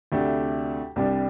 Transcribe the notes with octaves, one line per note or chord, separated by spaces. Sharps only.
D2 C3 A3 D4 G4
C2 C3 G3 D4 G4